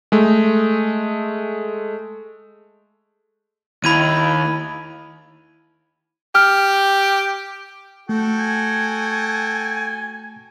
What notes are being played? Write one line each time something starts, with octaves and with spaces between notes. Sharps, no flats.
G#3 A3
D#2 E4 B5 G#6 D#7
G4 F6
A3 F#4 A4 G5
G#5